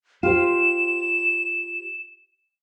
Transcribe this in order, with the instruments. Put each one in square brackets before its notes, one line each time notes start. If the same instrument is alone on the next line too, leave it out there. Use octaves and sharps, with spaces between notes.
[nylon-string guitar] F4 G4 C5 [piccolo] E7